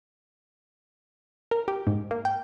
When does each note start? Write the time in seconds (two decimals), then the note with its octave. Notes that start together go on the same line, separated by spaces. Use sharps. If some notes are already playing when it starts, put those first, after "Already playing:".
1.51 A#4
1.68 G4
1.87 G#2
2.11 A#3
2.25 G5